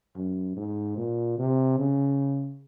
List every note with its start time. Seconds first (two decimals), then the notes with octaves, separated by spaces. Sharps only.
0.16 F#2
0.57 G#2
0.97 A#2
1.38 C3
1.79 C#3